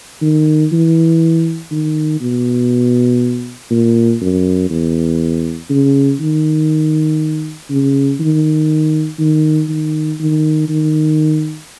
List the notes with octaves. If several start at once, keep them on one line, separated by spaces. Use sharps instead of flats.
D#3
E3
D#3
B2
A#2
F#2
E2
C#3
D#3
C#3
D#3
D#3
D#3
D#3
D#3